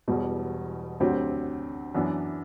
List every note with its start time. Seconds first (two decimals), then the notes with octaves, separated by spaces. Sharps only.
0.08 E1 E2 B2 G3
1.00 D2 D3 F#3 C4 G4
1.94 F#2 E3 B3 D4